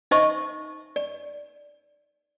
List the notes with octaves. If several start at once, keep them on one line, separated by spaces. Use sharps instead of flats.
D#4 C5 D#5 E5 A5 C#6
D5